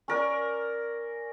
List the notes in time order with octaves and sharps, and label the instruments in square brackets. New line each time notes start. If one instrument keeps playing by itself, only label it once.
[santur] C#4 A#4 D5